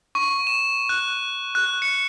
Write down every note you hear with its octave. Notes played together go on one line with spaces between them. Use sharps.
C#6
E7
F#6
F#6
C#7